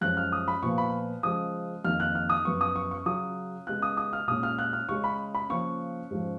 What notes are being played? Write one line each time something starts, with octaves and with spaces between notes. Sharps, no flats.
F#2 F3 G#3 C#4 F#6
F6
D#6
B5
A#2 F3 B3 C#6
B5
C#3 F3 G#3 D#6
F2 D#3 A#3 F6
F#6
F6
D#6
F#2 F3 B3 C#6
D#6
C#6
C#6
C#3 F#3 C#4 D#6
C#3 G#3 B3 F#6
D#6
D#6
F6
A#2 G#3 C#4 D#6
F6
F#6
F6
C#3 G#3 C#4 C#6
B5
B5
C#3 F3 A#3 C#4 C#6
G#2 F3 G#3 C#4